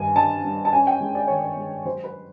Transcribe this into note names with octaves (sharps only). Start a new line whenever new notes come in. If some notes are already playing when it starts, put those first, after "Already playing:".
Already playing: G2 D#3 G#5
G3 A5
G3
A5
C#4 G#5
G5
G#3
D5
D#3 C#5
D5
G#3
F#3 C5
B4